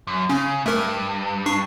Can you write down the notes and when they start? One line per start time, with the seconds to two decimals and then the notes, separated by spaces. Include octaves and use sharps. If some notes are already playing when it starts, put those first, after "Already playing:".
0.07 F#2
0.29 C#3 C#4
0.66 G2 A3 A#4
1.46 D4 C#6 C7